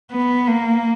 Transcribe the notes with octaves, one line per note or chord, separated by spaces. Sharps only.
B3
A#3